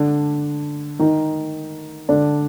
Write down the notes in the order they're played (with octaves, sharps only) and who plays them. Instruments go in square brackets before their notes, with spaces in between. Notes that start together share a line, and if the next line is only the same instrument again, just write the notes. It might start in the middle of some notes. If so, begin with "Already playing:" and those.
Already playing: [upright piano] D3 D4
D#3 D#4
D3 D4